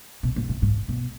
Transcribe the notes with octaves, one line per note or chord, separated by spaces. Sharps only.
B2
A#2
A2
G#2
B2